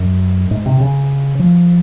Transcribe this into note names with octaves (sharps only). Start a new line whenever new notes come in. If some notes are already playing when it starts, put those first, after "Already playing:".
Already playing: F#2
G#2
C3
C#3
F3